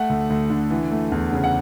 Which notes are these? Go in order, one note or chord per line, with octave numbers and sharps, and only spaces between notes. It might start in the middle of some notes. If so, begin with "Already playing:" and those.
Already playing: A3 F#5
D2
D2
D3
E3
A3
E2
C#3
F#5